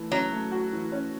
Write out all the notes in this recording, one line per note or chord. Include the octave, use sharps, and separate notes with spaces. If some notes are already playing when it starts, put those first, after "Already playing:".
Already playing: E3 A3
F#3 C#4
A3
F#4
E3
C#4